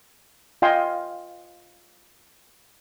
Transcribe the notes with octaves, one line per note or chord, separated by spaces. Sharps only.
F4 D#5 F5 G5 G#5 C6